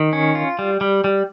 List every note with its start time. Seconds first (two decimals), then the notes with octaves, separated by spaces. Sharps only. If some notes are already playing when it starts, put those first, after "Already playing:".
Already playing: D#3
0.13 C#4
0.35 F4
0.59 G3
0.81 G3
1.04 G3